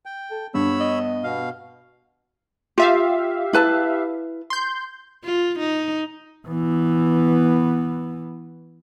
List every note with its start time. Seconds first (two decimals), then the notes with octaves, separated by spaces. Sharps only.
0.06 G5
0.31 A4
0.54 G2 B3 C#5 B5 E6
0.80 D#5
1.24 B2 F5
2.78 F4 G4 E5 F5
3.53 E4 B4 A5
4.50 C6 G6
5.24 F4
5.59 D#4
6.48 E3 B3